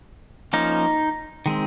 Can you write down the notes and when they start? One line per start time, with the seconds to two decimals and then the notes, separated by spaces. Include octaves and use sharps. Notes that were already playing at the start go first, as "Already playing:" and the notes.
0.53 F3 A#3 C#4 D#4
1.46 D#3 G#3 C4